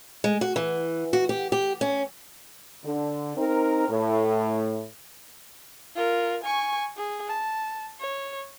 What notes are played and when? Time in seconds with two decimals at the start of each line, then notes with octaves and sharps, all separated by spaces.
0.24 G#3
0.41 F#4
0.56 E3
1.13 F#4
1.29 G4
1.52 G4
1.81 C#4
2.85 D3
3.37 C4 D#4 A#4
3.89 A2
5.96 F4 A#4
6.43 G#5 C#6
6.97 G#4
7.28 A5
8.00 C#5